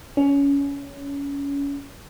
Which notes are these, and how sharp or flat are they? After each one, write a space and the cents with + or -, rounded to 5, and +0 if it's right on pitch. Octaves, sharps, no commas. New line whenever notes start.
C#4 +25